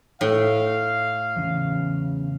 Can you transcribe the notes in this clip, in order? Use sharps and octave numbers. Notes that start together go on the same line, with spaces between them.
A2 F5
E2 C#3